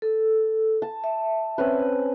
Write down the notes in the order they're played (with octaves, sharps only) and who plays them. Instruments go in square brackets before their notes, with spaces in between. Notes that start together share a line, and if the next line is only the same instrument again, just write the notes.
[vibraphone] A4
[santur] A5
[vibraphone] E5
[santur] C4 C#4 B4